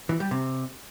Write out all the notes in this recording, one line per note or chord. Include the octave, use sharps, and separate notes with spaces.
E3
G3
C3